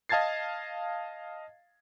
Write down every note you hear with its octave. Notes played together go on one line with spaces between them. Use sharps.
D#5 F5 A5 G#6 A6 C7